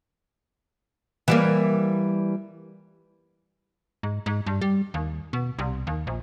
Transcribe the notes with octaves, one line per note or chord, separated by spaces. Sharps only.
E3 G3 A#3
G#2
G#2
G2
G3
D#2
B2
C2
D#2
A#1